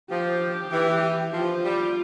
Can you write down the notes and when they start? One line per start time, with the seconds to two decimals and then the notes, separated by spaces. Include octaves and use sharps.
0.11 F3 G4
0.73 E3
1.33 F3 F4
1.64 G3